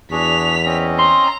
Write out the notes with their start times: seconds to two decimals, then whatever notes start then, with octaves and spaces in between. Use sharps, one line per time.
0.11 E2 D4 F#4 G#4 B6 F7
0.65 C4 C#4 D#5
0.99 A#5 C6